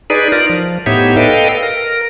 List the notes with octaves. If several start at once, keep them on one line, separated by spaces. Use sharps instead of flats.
D#4 G#4 B4 D5
D#4 F4 A#4 D5
F3
A2 B3 D#4 G4 C#5 E5
A4 B4 D#5 F5 G5
A#4